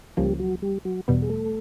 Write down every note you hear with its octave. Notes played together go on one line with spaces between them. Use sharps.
C#2 C#3 F3 G3 A#3 G4
F#3 F#4
G3 G4
F#3 F#4
E2 B2 G3 B3
G#4
A3 A4